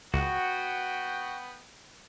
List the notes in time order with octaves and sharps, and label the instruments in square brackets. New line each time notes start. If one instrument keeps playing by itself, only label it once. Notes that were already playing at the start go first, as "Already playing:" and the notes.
[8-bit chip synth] C#2 [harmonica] B3 F#5 G5 [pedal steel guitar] F#4